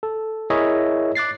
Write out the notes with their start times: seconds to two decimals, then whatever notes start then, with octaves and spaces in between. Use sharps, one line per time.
0.03 A4
0.50 E4 G#4 A#4 C#5 D#5 E5
1.15 D6 F#6 A6 C7